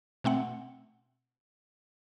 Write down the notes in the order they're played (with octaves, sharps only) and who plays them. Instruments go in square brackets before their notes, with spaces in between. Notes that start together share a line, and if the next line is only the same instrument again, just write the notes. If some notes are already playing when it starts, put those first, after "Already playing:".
[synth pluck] B2 A3 C4 F#5